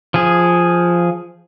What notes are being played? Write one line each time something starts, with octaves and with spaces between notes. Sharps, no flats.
F3 G#4